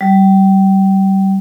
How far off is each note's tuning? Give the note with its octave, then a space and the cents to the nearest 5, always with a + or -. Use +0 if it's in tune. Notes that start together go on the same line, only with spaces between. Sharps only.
G3 -25